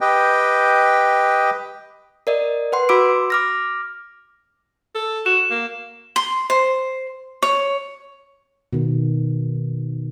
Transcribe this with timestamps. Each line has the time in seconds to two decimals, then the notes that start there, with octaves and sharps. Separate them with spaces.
0.01 G4 B4 D#5 G5
2.27 A#4 D5 D#5
2.72 B4 F#5 C6
2.89 F#4 B5 C6 D6 E6 D7
3.30 D6 F6 A#6
4.95 A4
5.26 F#4 E7
5.51 A#3
6.16 C6
6.50 C5
7.42 C#5
8.73 B2 D#3